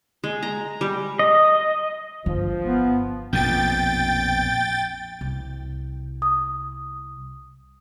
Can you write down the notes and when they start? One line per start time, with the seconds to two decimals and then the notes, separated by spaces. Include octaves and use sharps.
0.24 G#3
0.43 A#5
0.81 G3
1.19 D#5
2.26 G1 F3
2.65 B3
3.33 A#1 F2 B2 G5 A6
5.21 C2
6.22 D#6